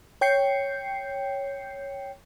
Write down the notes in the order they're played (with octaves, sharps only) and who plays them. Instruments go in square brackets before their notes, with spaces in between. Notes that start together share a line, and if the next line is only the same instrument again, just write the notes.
[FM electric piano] C#5 G5 G6 C7 C#7